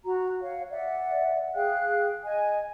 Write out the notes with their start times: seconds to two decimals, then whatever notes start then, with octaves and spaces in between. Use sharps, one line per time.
0.04 F#4 A#5
0.43 C#5 F5 F#5
0.71 D5 E5 F#5
1.55 G#4 F5 G5 F#6
2.23 D#5 G#5